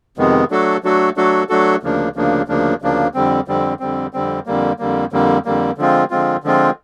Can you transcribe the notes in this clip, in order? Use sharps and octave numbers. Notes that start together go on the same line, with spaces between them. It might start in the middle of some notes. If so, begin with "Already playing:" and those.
F2 C3 D#3 G#3 B3
F#3 A3 D4 F#4 A4
F#3 A3 D4 F#4 A4
F#3 A3 D4 F#4 A4
F#3 A3 D4 F#4 A4
D2 C#3 F3 A#3 D4
D2 C#3 F3 A#3 D4
D2 C#3 F3 A#3 D4
D2 C#3 F3 A#3 D4
F2 D3 G3 C4
F2 D3 G3 C4
F2 D3 G3 C4
F2 D3 G3 C4
F2 D3 G3 A#3
F2 D3 G3 A#3
F2 D3 G3 A#3
F2 D3 G3 A#3
D3 F3 G#3 C4 F4
D3 F3 G#3 C4 F4
D3 F3 G#3 C4 F4